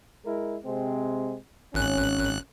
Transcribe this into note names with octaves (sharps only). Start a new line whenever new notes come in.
G#3 E4 A#4
C3 G#3 C4
G#1 C#4 F#6